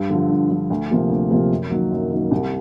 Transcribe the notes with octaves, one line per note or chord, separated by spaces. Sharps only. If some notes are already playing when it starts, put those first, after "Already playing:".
Already playing: G2
D3 F3
G2
D3 F3
D2
C3 F3 A#3
D2
C3 F3 A#3
F#2
D#3 F#3 A#3
F#2
D#3 F#3 A#3
C2